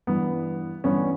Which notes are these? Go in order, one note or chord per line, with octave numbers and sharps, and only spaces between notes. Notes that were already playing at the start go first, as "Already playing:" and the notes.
G2 E3 B3
G2 E3 B3 C#4